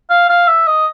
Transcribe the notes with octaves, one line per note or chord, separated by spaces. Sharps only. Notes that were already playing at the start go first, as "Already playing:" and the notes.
F5
F5
E5
D#5